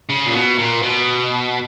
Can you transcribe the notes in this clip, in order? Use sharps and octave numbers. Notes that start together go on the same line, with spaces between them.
C#3
A#2
B2
A#2
B2